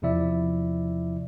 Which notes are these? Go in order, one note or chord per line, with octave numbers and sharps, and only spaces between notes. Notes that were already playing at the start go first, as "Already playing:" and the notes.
E2 C3 F3 E4 D5 E5